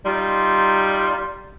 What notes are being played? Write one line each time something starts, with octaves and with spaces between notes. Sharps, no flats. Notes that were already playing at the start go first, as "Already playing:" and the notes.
G3 D#4 F4 C6